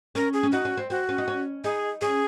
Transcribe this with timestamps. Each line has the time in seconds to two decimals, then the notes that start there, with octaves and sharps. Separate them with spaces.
0.15 C#4 A#4
0.33 G#4
0.43 C#4
0.52 D#4 F#4
0.65 C#4
0.77 C4
0.90 C4 F#4
1.09 C#4
1.18 D#4
1.28 C#4
1.64 D#4 G#4
2.01 C#4 G#4